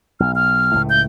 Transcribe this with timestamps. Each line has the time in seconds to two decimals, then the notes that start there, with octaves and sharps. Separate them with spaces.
0.20 B1 F6
0.35 F6
0.74 C#2 A2 A3
0.90 G6